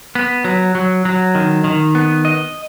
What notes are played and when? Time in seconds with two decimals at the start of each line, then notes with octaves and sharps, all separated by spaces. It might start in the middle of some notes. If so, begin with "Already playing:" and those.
0.15 B3
0.44 F#3
0.75 F#3
1.05 F#3
1.35 D#3
1.64 D#3
1.95 B3
2.25 D#5